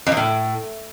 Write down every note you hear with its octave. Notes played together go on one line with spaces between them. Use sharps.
F2
E2
A2